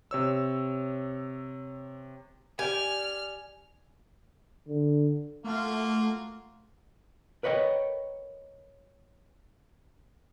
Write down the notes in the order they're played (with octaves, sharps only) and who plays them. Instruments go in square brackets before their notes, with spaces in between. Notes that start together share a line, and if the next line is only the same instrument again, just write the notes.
[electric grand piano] C3 C#5 E6
[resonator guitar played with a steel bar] G4 D5 [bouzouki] G#5 [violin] F6
[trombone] D3
[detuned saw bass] A3 [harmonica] A#3 F4 F#4
[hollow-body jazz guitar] A#4 B4 C#5 D#5 G5